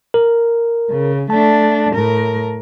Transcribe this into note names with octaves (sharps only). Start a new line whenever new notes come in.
A#4
C#3
A3 D4 A5
A2 A#4